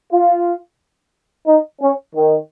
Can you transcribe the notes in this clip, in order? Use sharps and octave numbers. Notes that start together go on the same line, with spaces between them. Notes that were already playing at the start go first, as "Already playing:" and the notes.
F4
D#4
C#4
D#3